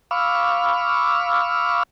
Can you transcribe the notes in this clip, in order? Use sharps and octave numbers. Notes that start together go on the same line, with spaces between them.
F5 B5 C#6 D6 E6 F6